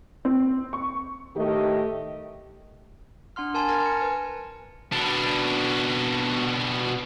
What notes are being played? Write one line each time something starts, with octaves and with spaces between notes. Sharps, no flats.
C4
C#6
A2 D#3 A3 G4 D#5
D4 F#5 C6 F6
A#4 G#5 A5 C6
A#4 A5 A#5 F6 G#6 A6
C#7
B4 G#5
B2 D4